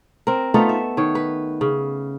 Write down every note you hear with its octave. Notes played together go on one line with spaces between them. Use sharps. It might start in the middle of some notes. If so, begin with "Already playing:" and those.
C4 A#4
A3 B3 D#4 F4
E5
D#3 C#5
B4
C#3